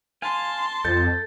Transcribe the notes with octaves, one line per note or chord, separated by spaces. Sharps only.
F5 G#5 A5 C6
F2 A4 G6 A6